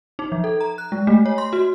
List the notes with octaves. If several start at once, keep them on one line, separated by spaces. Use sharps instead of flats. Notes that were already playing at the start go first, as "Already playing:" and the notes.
D#4
F3
A4
A#5
F#6
G#3
A3
C#5
C6
F#4